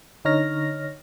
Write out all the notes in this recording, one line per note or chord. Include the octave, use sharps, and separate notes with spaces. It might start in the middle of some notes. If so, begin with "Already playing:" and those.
D3 D#4 C#5 F6 A#6